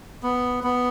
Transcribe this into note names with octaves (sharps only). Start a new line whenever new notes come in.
B3
B3